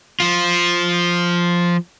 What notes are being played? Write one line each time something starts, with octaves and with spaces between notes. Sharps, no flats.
F3 F4